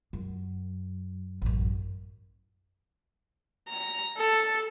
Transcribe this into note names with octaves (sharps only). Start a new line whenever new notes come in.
F#2
A1 F#2
A#5
A4